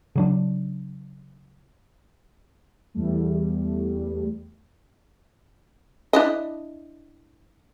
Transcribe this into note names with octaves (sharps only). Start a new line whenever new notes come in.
C#3 F#3 D4
E2 G3 A3
D4 E4 D#5